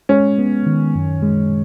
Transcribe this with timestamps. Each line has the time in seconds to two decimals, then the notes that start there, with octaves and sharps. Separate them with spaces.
0.09 G#3 C#4
0.38 B3
0.66 D#3
0.95 F#2
1.22 G#3